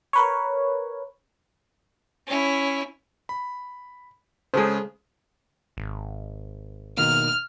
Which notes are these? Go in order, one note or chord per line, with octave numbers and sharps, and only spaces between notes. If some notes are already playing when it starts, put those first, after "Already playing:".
A#4 B4 C#5
C#4 E4
B5
C#3 G#3 G#4 A4 C5
G#1
B2 D#3 A#3 F6